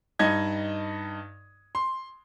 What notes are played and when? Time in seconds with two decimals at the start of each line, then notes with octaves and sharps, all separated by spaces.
0.19 G2 D#4 D#5 G#6
1.75 C6